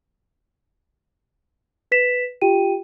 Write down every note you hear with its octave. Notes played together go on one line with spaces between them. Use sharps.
B4 B6 E7
F4 G4 G5 D#7